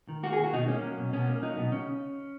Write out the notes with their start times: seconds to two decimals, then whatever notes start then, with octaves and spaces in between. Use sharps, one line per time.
0.09 D#3
0.23 A#3 F#4
0.33 G#4
0.39 D#3 F#4
0.53 B2 D#4
0.68 A#3 C#4
0.83 F#3
0.98 B2
1.13 B2 C#4
1.28 A#3
1.42 F#3 D#4
1.57 B2
1.72 C#3 C#4